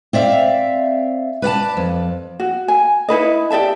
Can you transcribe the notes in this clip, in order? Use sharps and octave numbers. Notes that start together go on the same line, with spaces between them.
C4 D5 E5 F5
B4 D5 F5 A5
F2
F#4
G#5
D#4 E4 B4 D#5
G4 D5 E5 A5